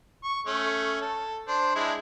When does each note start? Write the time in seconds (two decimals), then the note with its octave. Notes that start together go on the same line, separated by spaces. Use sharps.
0.24 C#6
0.47 A3 C#4
1.02 A4
1.48 D4 C5
1.76 G#3 D4 E4